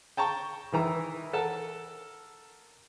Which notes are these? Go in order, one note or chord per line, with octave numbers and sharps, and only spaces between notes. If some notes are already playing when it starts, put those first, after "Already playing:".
G5 A5 A#5 C#6
D#3 E3 A#5 E6
A4 A#4 F#5 A5